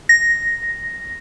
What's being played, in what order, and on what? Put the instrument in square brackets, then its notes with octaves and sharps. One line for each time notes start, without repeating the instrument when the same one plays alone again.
[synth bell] A#6